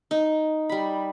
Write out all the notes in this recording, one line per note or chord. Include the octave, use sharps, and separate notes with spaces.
D#4
G3 B5